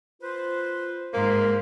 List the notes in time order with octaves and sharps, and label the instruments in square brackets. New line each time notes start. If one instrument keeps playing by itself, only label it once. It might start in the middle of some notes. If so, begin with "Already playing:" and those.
[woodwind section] F4 B4 C5
[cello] G#2 [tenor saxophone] A#3 [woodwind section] C5 C6